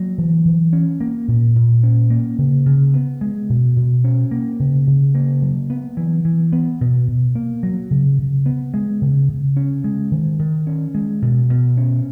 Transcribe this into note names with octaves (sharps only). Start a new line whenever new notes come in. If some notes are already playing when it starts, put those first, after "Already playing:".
Already playing: F#3 A#3
E3
E3
C#4
A#3
A#2
A#2
C#4
A#3
C#3
C#3
B3
G#3
B2
B2
C#4
A#3
C#3
C#3
A#3
F#3
B3
E3
E3
B3
B2
B2
A#3
F#3
C#3
C#3
B3
G#3
C#3
C#3
C#4
G#3
D#3
D#3
C#4
G#3
B2
B2
C#4